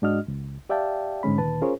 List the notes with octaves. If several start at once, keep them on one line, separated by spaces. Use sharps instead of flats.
G#2 G#3 D4 F#4 D#5 F6
C#2
G4 D5 E5 F5 G5 A5
G#2 D3 G#3 C#4 B5
D2 A#2 D#3 B4 A5
C#4 F4 G#4 A#4 C5 C#5